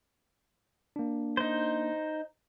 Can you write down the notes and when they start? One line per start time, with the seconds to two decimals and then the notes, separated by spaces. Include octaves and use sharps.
0.96 A#3 D4
1.37 D#4 C5